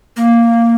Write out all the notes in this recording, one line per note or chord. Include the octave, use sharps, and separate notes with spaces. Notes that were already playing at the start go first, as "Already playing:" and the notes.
A#3